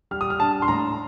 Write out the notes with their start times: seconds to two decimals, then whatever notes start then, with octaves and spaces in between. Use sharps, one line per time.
0.11 G3 F6
0.21 D#6
0.30 F6
0.40 D4 A5
0.62 C6
0.68 A2 A#5